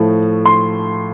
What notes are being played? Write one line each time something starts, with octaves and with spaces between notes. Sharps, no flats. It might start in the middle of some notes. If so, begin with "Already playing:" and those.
Already playing: A2 F3 A3
C6